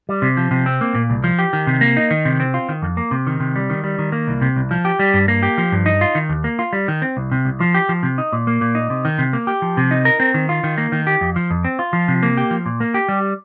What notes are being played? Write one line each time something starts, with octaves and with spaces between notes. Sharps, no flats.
G3
C3
F3
C3
C4
A#3
A#2
C2
F3
G4
D#3
C3
A#3
D#4
D#3
C3
C4
F4
D#3
F2
A#3
C3
D#3
C3
G3
D#3
G3
D#3
A#3
C2
C3
C2
F3
G4
G3
G2
A#3
G4
F3
G2
D#4
F4
D#3
D#2
A#3
F4
G3
D#3
C4
C2
C3
C2
F3
G4
F3
C3
D#4
A#2
A#3
A#2
D#4
C3
D#3
C3
A#3
G4
F3
C3
D#4
A#4
C4
D#3
F4
D#3
A#3
D#3
G4
F2
F3
F2
C4
F4
F3
C3
A#3
G4
F3
A#2
A#3
G4
G3